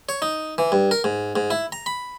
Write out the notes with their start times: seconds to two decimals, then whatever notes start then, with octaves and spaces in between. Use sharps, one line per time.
0.09 C#5
0.22 D#4
0.58 E3
0.72 G2
0.91 A#4
1.04 G#2
1.36 G#2
1.51 E4
1.72 A#5
1.86 B5